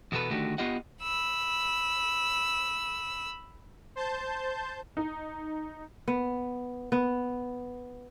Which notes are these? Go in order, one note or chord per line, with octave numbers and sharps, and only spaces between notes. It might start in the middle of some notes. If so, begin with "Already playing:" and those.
E2 B2 B3 A4 B4
D3 D#3 A3 F#4 G4
B3 F4 G4 D#5 F#5
B5 E6
C5 A5 G6
D#4
B3
B3